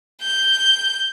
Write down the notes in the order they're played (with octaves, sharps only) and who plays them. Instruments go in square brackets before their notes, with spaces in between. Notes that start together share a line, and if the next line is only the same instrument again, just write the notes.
[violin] G6